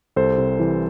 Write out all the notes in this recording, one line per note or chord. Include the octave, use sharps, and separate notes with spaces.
C2 A4 C5
C3
E3